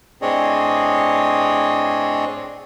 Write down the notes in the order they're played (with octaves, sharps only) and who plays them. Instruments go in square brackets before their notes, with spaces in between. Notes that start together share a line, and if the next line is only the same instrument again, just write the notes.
[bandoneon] A2 C4 D4 G#4 C#5 D#5